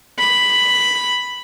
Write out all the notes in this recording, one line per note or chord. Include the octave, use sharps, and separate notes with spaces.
B5